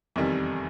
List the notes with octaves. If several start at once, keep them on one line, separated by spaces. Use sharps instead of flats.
F1 E2 C3 D#3 G3